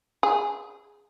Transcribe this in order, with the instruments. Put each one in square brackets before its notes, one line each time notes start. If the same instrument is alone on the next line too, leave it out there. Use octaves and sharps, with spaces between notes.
[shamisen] G#4